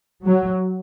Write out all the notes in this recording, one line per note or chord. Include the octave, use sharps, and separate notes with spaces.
F#3